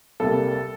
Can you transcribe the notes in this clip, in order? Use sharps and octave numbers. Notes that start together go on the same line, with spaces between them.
C2 C3 G3 A#3 A4